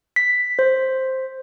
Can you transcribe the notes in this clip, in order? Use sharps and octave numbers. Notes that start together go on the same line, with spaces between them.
B6
C5